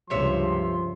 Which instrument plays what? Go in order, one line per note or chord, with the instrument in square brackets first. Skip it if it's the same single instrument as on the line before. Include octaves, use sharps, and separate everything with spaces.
[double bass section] C#2 G2 [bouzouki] C3 C#5 E5 [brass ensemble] F3 [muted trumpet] C6